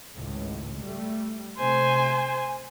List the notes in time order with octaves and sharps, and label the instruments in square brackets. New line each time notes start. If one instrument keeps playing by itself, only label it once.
[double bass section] G#1 C#2 A2
G3 A3
[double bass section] C3 A3 [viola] C5 G#5